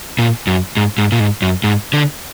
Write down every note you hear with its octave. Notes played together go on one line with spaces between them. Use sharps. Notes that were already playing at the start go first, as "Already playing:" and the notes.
A#2
F#2
G#2
G#2
A#2
G#2
F#2
G#2
D3